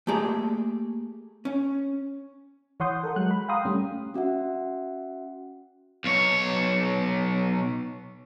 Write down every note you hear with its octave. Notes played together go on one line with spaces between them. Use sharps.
A3 A#3 G4 G#4 A5
C#4
E3 C#5 F#5 C6 D#6 G6
A4 A#4 F#5
F#3 G#3 F#5 F#6
B5
F5 G5 A#5 C6 D#6
G3 A3 C#4
C#4 F#4 E5 F#5
B1 C#5